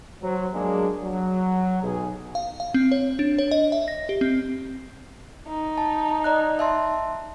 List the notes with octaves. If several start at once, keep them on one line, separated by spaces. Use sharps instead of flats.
F#3 C5
F#3 G#3 A#3 D4 G#4
F#3
B1 G#4
F5
F5
C4
C#5
D4
C#5
D#5
E5
A#6
G4
C4
D#4
A5
D5 D#5 F#6
E5 A5 C6